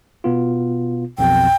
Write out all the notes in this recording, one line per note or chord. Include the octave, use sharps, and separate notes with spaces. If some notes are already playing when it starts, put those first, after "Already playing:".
B2 B3 F4
B1 F2 B2 G5